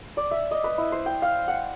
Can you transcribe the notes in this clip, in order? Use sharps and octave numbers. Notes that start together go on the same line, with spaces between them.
D5
E5
D#5
B4
E4
C5
G5
F5
F#5